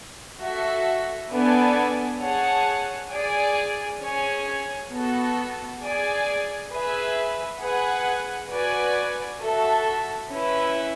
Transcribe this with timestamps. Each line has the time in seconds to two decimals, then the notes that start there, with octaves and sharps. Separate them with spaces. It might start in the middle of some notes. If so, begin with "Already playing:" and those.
0.40 F#4 A4 E5
1.30 B3 D4 A4 D5 G#5
2.20 G#4 C#5 F#5 A5
3.10 G#4 D5 G#5
4.01 C#4 G#4 C#5 G#5
4.91 B3 F#4 A4
5.81 G#4 D5 G#5
6.70 G#4 B4 E5
7.61 G#4 B4 F#5
8.51 F#4 B4 D5 G#5
9.41 F#4 A4 E5 A5
10.31 C#4 E4 B4